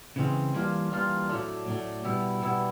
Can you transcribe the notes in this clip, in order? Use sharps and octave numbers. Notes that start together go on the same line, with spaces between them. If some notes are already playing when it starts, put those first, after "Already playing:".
C#3 E3 G#3 C4
E3 G3 A#3 D4 F4
E3 G3 A#3 D4 F4
A2 F#3 A3 D4
A2 F#3 A3 D4
B2 G3 B3 E4
B2 G3 B3 E4